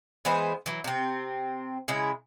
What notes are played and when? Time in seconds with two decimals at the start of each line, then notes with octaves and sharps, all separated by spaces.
0.25 E3 G#3 B3 C5
0.66 E3 F#3
0.84 C3 C4
1.88 C#3 G#3 E4